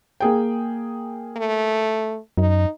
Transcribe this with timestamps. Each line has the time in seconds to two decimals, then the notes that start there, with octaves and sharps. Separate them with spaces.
0.20 A#3 G#4 G5
1.36 A3
2.37 F#2 D#4